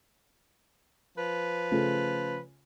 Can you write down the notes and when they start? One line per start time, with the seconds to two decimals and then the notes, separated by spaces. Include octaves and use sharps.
1.17 F3 B4
1.72 C#3 A3 F4